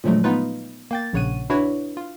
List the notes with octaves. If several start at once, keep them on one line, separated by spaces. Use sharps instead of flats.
A#2 D3 F3 F#3 G#3 A3
B3 D#4 F4 B4
A#3 G5 A6
A#1 C#3 C#5 F#5 D#7
D4 E4 F#4 B4 C#5
F4